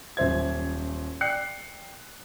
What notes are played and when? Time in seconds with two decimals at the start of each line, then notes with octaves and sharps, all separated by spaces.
0.17 D#1 F#2 C5 E5 G#6
1.21 D5 G5 F#6 C7 C#7